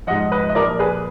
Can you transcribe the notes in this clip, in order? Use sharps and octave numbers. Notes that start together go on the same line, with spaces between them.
G#2 F3 D#5 F#5
B4 D#5
D#5
A#2 F3 A#4 D5
G#4 B4